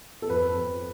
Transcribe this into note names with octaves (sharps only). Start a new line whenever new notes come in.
A4
F2 B4
F2